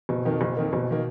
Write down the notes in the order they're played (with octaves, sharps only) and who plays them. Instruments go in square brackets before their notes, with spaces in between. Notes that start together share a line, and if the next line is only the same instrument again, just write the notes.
[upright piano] F#1 [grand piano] B2
[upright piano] F2 D#3 A#3
F#1
F2 D#3 A#3
[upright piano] F#1 [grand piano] B2
[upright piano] D#3 A#3